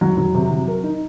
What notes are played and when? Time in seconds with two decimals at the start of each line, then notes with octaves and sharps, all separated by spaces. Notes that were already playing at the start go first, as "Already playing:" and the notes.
0.01 F#3
0.17 F#3
0.34 C3
0.51 F#3
0.68 A#4
0.84 D#4